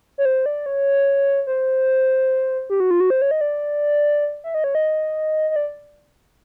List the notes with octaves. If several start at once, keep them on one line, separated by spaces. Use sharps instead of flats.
C#5
C5
D5
C#5
C5
G4
F#4
F4
F#4
C5
C#5
D#5
D5
E5
D#5
C#5
D#5
D#5
D5